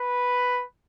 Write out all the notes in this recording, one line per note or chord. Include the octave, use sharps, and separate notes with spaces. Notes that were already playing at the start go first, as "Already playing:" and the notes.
Already playing: B4